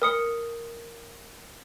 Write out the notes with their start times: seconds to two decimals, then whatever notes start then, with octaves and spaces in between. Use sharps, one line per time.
0.02 A#4 D#6 C#7